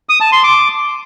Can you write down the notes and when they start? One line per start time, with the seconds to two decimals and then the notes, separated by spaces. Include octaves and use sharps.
0.09 D#6
0.21 A5
0.32 C6
0.44 D6